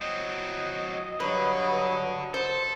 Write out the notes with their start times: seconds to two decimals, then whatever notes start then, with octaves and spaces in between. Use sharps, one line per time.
0.01 F#3 C4 D#5
1.20 G2 D3 F#3 B4
2.34 A4 C5